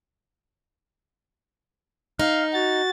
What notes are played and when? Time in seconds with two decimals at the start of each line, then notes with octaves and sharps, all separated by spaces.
2.19 D#4 F5
2.54 F#4 A6